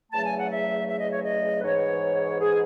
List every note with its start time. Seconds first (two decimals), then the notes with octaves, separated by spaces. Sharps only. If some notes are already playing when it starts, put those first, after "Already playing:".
0.12 E2 C#3 F#3 A3 A5
0.25 G#5
0.37 F#5
0.50 E5
0.87 E5
1.00 D#5
1.11 C#5
1.23 D#5
1.57 B4
1.63 G#2 E3 B3 C#5
2.38 G#4